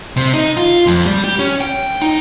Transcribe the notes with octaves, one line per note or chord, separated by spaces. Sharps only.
C3
D#4
F4
F2
G3
G4
C#4
G5
D#4